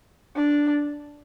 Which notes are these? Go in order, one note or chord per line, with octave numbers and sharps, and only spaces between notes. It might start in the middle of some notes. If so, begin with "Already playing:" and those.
D4